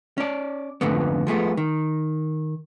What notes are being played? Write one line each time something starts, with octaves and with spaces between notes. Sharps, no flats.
C#4 D5
F2 G#2 D3 A3 B3
F3 G#3 A3 B3
D#3